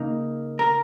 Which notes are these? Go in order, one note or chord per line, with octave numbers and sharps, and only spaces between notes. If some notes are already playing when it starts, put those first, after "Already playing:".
Already playing: C#3 A#3 D#4
A#4